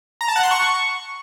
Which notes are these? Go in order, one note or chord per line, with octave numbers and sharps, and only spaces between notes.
A#5
A5
F#5
C6
C#6